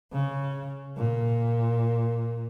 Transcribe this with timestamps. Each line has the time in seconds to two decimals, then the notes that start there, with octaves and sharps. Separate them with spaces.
0.12 C#3
0.97 A#2